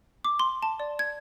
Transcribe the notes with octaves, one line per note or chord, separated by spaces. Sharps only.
D6
C6
A5
D5
G#6